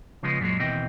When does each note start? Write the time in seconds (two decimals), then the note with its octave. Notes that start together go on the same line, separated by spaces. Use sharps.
0.23 C#3 F3 G#3 B3
0.40 F#2 A#2 E3 F#3 G#3
0.59 D#2 B2 E3 C4 D#5 G5